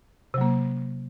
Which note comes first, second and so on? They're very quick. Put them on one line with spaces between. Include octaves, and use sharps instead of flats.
C3 F#3 A#3